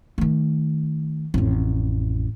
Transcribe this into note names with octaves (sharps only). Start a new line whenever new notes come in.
D#3 A3
A1 F2